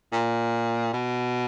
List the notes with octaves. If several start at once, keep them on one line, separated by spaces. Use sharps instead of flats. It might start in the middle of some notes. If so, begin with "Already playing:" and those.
A#2
B2